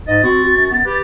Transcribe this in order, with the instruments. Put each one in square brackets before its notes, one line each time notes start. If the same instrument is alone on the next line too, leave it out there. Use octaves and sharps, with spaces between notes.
[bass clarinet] G#2 [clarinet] D#5 [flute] A6
[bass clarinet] C4 [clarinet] F#4
[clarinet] F#4
[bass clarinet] F#2
[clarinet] B3
[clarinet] G4 [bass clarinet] B4